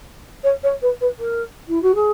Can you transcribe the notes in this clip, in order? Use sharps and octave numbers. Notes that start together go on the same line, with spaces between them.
C#5
C#5
B4
B4
A#4
E4
F#4
G#4